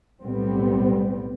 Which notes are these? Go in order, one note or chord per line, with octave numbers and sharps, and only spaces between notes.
B1 A2 G3 B3 C4